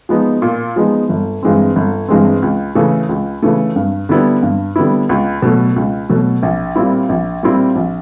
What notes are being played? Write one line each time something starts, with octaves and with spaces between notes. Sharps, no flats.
F3 G#3 B3 D#4
A#2
F3 G#3 B3 D#4
G1
G2 E3 G#3 C4
G1
G2 E3 G#3 C4
C#2
C#3 E3 A3
C#2
C#3 E3 A3
G2
D3 G3 B3 E4
G2
D3 G3 B3 E4
C#2
B2 F#3 A3
C#2
B2 F#3 A3
A#1
A#2 G3 C4 E4
A#1
A#2 G3 C4 E4
A#1